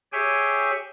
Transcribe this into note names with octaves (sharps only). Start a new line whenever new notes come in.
G4 G#4 C#5 E5 G5 G#5